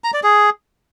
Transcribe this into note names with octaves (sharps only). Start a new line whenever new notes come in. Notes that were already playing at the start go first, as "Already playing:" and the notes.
A#5
D5
G#4